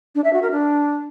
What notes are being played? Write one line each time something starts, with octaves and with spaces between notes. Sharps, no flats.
D4
E5
F#4
A#4
D4